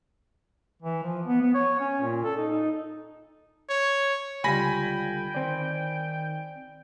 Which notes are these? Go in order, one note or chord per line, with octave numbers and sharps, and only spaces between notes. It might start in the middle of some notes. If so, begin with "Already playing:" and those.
E3
F3
B3
B3
C#5
C#4
A#2
A4
D#4
D#4
C#5
C#2 D3 G3 F4 G5 G#5 B5 A#6
D#3 C4 D5